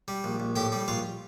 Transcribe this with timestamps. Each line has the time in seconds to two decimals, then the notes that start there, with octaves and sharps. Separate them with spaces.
0.08 G3
0.24 A#1
0.40 A#1
0.56 A2 G4 G5
0.72 G3
0.88 A#1 F4 F5